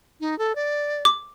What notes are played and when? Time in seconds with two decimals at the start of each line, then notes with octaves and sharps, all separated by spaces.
0.20 D#4
0.38 A4
0.55 D5
1.05 D6